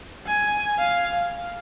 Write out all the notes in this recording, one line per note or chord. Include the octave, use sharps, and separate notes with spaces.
G#5
F5